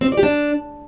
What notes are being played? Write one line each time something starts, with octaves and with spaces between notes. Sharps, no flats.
C4
C5
D5
G4
D4